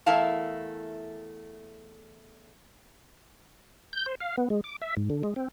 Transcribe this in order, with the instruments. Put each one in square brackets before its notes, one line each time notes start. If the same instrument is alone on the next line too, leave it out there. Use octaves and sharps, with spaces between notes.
[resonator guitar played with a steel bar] E2 A3 E4 A#4 F5 A5
[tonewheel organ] G6
C5
F5
B3
G#3
D6
E5
G#2
D3
G#3
C4